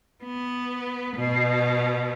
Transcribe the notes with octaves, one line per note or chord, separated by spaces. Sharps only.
B3
B2